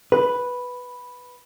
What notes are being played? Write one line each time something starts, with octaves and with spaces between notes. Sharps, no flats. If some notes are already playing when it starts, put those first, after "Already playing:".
B4